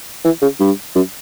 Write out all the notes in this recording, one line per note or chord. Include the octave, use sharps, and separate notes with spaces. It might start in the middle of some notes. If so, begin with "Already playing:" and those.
E3
C#3
G2
F#2